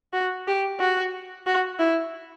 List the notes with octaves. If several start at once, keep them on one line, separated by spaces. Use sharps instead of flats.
F#4
G4
F#4
F#4
E4